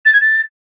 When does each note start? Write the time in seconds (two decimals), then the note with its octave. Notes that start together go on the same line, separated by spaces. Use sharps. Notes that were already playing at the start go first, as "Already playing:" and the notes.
0.05 A6
0.13 G#6
0.21 A6